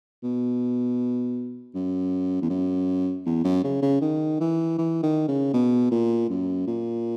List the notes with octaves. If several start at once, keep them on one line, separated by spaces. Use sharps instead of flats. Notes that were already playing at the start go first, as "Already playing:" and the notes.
B2
F#2
E2
F#2
E2
F#2
C#3
C#3
D#3
E3
E3
D#3
C#3
B2
A#2
F#2
A#2